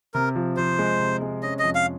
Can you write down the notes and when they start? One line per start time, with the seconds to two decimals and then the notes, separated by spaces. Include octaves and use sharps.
0.14 C3 A#4
0.35 F3
0.57 F3 C5
0.79 G#3
0.99 C3
1.22 G#3
1.43 C#4 D#5
1.59 F2 D#5
1.75 F5